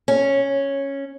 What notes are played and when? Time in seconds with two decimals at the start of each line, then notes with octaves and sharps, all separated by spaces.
0.08 C#4